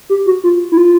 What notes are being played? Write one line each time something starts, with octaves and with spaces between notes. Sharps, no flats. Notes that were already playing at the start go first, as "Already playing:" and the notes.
G4
F#4
F4
E4
F4